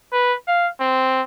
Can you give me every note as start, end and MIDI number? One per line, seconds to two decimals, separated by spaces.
0.13 0.34 71
0.48 0.68 77
0.80 1.22 60